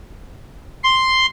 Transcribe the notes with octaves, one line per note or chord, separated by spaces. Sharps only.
C6